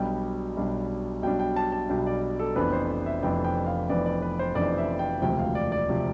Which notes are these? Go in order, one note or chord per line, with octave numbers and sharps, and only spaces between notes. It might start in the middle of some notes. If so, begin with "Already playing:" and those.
Already playing: B1 B2 G3 D4 G5
B1 B2 G3 D4
B1 B2 G3 D4 G5
G5
A5
A5
B1 B2 G3 D4 G5
D5
A4
F1 F2 E3 B3 D4 B4
C5
E5
F1 F2 E3 B3 D4 G5
G5
F5
F1 F2 E3 B3 D4 D5
D5
B4
C5
F1 F2 E3 B3 D4 D5
E5
G5
E1 D2 C3 F3 G5
F5
D5
D5
C3 F3